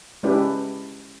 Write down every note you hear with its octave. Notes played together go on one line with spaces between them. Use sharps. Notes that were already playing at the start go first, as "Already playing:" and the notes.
G#3 C#4 D4 E4 G4 B4